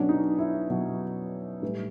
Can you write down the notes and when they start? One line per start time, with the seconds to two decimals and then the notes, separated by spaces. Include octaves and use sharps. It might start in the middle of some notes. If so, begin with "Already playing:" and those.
Already playing: B2 F#3 C#4 D4
0.09 D#4
0.39 E4
0.70 B2 F#3
1.62 A2 E3 G3